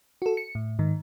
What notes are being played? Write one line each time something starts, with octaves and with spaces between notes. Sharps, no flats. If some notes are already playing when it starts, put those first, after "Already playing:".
F#4 A4
C#7
A2
G#2 D#3